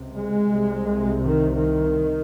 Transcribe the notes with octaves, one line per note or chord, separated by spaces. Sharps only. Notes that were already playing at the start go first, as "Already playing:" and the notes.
Already playing: C#2 C3
G#3
C2 C3
D#3
D#3